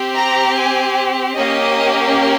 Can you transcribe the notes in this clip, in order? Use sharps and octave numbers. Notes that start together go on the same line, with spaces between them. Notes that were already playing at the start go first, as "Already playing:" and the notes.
Already playing: C4 G4
A#5
G#5
A#3 C#4 G4 D#5